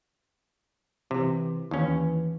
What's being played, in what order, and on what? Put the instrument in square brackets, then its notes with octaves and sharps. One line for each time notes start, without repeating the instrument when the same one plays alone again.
[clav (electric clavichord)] C3 [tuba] E3
[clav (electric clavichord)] D#2 C#4 [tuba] E3